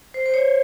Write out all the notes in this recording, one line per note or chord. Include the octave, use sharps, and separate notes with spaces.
C5
C5
C#5